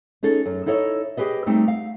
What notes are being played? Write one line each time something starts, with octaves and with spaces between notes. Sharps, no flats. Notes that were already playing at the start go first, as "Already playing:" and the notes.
C#4 D#4 G#4 A4
F#2
D#4 E4 A4 C#5 D#5
G4 G#4 B4 D#5
G3 A3 C4 D#4
F5